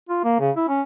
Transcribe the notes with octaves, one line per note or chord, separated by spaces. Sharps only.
F4
A#3
C#3
E4
C#4